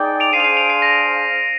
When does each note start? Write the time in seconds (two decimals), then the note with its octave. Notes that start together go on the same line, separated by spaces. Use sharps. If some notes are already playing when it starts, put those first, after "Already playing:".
Already playing: D#4 G#4 D5 G5
0.20 D7 F7
0.33 D4 G#4 C5 F5 C7 D#7
0.40 F7
0.44 C7 D#7
0.57 D7 F7
0.70 C7
0.82 A#6